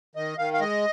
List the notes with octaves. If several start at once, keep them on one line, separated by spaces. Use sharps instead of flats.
D#3 D#5
D#3 F5
F5
G#3 D#5